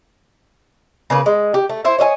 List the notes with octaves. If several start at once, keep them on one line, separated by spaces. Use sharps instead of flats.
C#3 A#3 B4
G#3
G4
A3
E4 C5 E5
C#5 D#5 E5 G#5